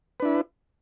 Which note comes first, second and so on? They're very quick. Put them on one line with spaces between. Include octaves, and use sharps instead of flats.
B4 D4 E4